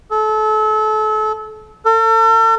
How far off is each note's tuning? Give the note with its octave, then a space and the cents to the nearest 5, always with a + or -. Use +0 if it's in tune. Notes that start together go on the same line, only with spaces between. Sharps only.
A4 -30
A4 +40